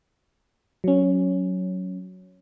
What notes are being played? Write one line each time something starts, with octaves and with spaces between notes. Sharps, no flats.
F#3 C#4